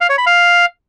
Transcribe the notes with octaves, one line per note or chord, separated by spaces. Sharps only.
F5
C#5
B5
F5